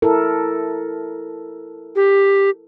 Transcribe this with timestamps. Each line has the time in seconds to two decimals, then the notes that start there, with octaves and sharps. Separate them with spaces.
0.02 E4 A4 A#4
1.96 G4